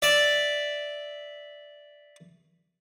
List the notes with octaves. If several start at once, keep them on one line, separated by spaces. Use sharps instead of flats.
D5 E5